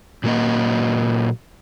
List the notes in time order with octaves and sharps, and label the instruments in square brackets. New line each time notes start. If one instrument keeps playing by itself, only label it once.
[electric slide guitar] A#2 F#3 G3 A#3 D#5